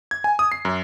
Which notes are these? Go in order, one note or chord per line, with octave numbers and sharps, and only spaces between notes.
G#6
G#5
D#6
C7
F#2